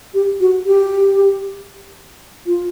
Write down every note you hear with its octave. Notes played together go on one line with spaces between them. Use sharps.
G4
F#4
G4
F4